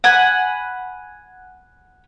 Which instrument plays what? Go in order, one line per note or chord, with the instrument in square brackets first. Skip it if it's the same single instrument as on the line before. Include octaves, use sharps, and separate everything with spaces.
[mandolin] F#5 G#5 B5